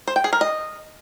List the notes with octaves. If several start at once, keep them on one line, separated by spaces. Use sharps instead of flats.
C5
G5
G#4
A#4
D#5